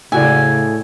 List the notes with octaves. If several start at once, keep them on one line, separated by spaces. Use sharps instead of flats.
A2 C#3 E4 F#4 D5 G#5